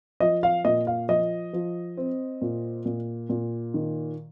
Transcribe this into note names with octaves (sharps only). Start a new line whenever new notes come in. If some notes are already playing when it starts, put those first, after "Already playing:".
F3 D#5
F5
A#2 D#5
F5
F3 D#5
F3
C4
A#2
A#2
A#2
D#3